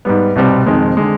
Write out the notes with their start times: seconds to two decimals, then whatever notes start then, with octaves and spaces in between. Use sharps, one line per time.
0.05 G#2 G3 B3
0.36 C2 B2 G3 C4
0.66 F2 D#3 G#3 C4
0.97 D3 G#3